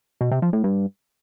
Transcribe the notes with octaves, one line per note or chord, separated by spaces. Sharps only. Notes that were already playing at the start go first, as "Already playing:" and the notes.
B2
C3
F3
A2
G2